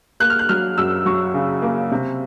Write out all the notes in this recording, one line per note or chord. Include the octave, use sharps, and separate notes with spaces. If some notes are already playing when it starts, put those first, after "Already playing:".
A#3 F#6
F6
F#6
F#3 F6
F#2 E6
F#3 C#6
C#3
A#3
C3